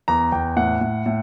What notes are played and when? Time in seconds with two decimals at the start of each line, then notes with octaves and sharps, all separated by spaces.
0.08 E2 A#5
0.32 E2 G5
0.57 A2 F#5
0.81 A2
1.06 A2